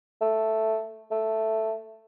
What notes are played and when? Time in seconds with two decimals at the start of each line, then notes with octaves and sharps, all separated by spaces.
0.21 A3
1.11 A3